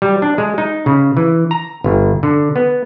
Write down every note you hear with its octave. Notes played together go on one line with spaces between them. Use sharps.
G3
D4
G#3
D#4
C#3
E3
A#5
G1
D3
B3